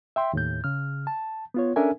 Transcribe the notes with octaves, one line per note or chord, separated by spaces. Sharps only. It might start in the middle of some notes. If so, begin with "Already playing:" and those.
E5 G5 C6
D#2 A2 G6
C#3 F6
A5
B3 F4 C#5
C#4 D4 A4 A#4 E5 G#5